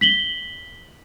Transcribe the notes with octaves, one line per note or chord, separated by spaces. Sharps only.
B6 F#7 G7